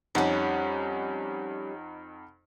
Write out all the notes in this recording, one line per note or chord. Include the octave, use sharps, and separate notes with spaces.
F2 G3 C#4 D#4 F#5